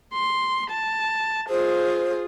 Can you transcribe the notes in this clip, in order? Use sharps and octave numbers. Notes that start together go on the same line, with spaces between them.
C6
A5
F4 G#4 C5